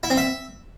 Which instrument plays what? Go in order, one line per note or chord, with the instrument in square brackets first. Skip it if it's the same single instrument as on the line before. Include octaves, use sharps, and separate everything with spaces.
[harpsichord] E4
C4
E5